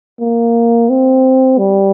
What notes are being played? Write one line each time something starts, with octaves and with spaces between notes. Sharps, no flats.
A#3
C4
G3